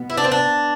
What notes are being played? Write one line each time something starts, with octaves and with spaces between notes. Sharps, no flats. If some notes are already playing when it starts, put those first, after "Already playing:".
Already playing: B2 B3
E4
D4
C4
D4